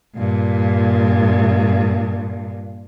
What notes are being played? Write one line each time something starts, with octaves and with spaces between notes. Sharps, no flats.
G2 A#2